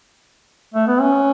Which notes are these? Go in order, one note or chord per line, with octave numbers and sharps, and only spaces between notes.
A3
B3
C#4